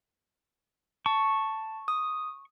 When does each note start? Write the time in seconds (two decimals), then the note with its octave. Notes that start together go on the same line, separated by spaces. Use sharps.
1.06 A5 C#6
1.88 D#6